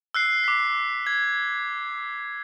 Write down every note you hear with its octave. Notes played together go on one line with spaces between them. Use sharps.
E6 F#6 C7
D6 B6
G#6